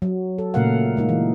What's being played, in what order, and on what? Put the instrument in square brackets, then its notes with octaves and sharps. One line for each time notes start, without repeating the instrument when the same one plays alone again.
[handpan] F#3
A4
A#2 C#3 A3 A#4 F5 F#5
G#3 A#3 D#4
E3